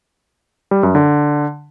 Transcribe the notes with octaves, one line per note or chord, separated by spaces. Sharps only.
G3
F#2
D3